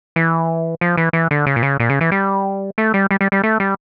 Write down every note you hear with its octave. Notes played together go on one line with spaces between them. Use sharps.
E3
F3
E3
E3
D3
C#3
A#2
C#3
A#2
C#3
E3
G3
A3
G3
G3
G3
G3
A3
G3